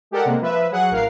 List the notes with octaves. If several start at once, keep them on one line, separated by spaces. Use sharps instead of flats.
G#3 G4 A4 A#4 D5 F#5
C3 G#3 A#3
F3 B4 E5
F#3 G#4 F#5
A1 A#4 F5 C7